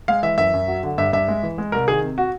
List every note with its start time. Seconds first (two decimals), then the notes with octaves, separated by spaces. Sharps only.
0.08 G#3 F5
0.23 E3 E5
0.38 F#2 E5
0.54 F#2
0.68 F#3
0.83 D3
0.98 G2 E5
1.13 G2 E5
1.28 G#3
1.43 E3
1.58 G#3
1.72 C2 A#4
1.88 D#3 G#4
2.02 C3
2.18 F#4